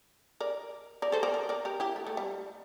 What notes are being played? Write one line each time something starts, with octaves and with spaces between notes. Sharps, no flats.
A#4 D5
A#4 D5
A4 C5
A#4 D5
A#4 D5
A#4 D5
G4 A#4
E4 G4
A3
A3
G3